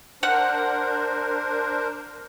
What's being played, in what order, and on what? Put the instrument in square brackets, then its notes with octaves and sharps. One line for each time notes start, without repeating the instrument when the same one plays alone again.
[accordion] D4 A#4 C5 [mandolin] F#5